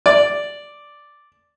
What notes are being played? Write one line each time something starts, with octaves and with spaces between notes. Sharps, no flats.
D5